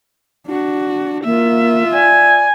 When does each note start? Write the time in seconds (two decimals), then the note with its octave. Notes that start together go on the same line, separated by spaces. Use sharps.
0.47 D4 F#4
1.25 A#3 F4 E5
1.93 D5 G#5